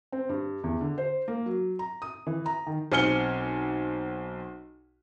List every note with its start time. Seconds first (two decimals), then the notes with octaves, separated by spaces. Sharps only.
0.12 C4
0.29 G2
0.64 E2
0.81 D3
0.98 C5
1.28 A#3
1.46 F#3
1.79 A#5
2.02 D#6
2.27 E3
2.46 A#5
2.67 D#3
2.92 B1 C4 G#5 F6 C#7 G7